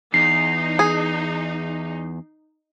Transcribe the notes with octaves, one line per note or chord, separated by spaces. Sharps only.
E2 D#4 C7
G#4